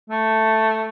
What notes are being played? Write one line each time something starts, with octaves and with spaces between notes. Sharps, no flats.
A3